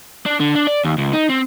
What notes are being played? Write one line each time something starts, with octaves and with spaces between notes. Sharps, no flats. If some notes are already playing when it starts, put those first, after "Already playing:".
D4
D3
D4
D5
D#2
C#2
D#4
C4